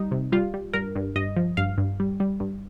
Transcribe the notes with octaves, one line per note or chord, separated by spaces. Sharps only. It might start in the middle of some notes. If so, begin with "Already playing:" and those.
Already playing: G3 D#4
C3
G3 F4
G3
G2 A#4
G2
G2 D#5
F3
G2 F5
G2
G3
G3
G2